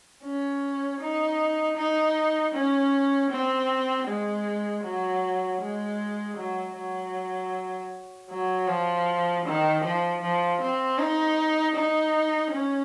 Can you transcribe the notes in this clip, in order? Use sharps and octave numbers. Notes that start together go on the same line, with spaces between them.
C#4
D#4
D#4
C#4
C4
G#3
F#3
G#3
F#3
F#3
F#3
F3
D#3
F3
F3
C4
D#4
D#4
C#4